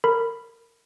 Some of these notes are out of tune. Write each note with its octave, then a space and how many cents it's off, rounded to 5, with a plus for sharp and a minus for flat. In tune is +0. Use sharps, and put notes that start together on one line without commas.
A#4 -15 B5 +0